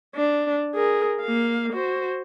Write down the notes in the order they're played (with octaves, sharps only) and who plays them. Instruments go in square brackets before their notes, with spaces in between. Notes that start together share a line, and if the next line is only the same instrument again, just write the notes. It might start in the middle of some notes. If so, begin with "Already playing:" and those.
[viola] D4
G#4 A#4
A#3 F5
F#4 C5